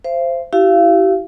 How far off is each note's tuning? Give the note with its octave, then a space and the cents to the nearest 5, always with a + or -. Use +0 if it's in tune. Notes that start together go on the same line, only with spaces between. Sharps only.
C5 +0 F5 -45
E4 +0 G4 -40 F5 -30